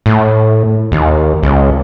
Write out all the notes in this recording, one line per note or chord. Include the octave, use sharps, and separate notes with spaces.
A2
D#2
C#2